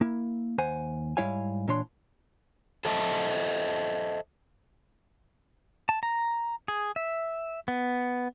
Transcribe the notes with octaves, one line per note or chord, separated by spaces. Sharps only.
A#3 E4
D#2 C5 F#5 G#5
G#2 G3 E4 C#5 F5 G#5
A#2 E3 D4 C#5 C6
A4 C5 D#5 E5 A5
A5
A#5
G#4
E5
B3